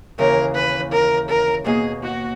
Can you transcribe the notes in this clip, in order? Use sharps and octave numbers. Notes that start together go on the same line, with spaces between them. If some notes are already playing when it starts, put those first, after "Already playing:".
D#2 C#3 E3 A#4
B4
A#4
A#4
B2 A#3 D#4 G#4
F#4